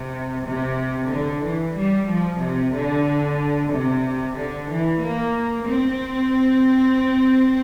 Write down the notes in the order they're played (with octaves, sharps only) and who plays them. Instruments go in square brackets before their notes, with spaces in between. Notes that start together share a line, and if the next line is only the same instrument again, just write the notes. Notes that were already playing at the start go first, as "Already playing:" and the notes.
Already playing: [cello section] C3
C3
D3
E3
G3
F3
C3
D3
C3
D3
E3
A#3
C4